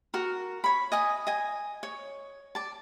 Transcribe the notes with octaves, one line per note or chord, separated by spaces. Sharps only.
F#4 A#4
C#5 B5
D#5 G#5 D#6
D#5 G#5
C#5
D5 A5